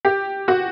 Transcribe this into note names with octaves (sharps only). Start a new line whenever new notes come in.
G4
F#4